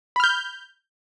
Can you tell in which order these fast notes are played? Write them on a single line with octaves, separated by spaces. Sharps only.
B5 F6 G6